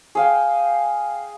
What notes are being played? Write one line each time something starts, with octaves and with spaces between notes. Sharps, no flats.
G#4 F5 G5